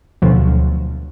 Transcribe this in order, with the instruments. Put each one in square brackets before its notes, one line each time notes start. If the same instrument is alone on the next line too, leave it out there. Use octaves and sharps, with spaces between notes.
[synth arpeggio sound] D2 B2 F3 F#3